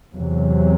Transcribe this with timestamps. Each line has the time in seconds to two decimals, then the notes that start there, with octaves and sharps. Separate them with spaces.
0.15 E2 C3 F#3